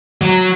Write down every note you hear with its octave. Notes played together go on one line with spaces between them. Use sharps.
F#3